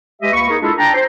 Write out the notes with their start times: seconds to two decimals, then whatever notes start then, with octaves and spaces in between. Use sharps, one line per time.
0.22 G#3 G4 B4 D#5 E5
0.33 C#2 A#3 B5 C#6
0.49 D#4 G#4 A#4
0.61 G#3 D4 E4 F4 G#4 A4
0.78 D4 G5 A#5
0.94 C5